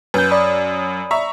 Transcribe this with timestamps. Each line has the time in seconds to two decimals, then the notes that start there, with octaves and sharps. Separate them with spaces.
0.14 F#2 B4 G6
0.31 D5 B5 D#6
1.11 E5 A#5 C#6